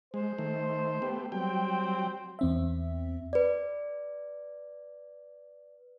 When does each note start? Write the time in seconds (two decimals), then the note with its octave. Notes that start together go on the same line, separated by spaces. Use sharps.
0.14 G#3 C5
0.38 D#3 A3
1.02 A3 B3 G4
1.32 F#3 G3 C4 G5
2.39 E2 C4 E5
3.33 B4 D5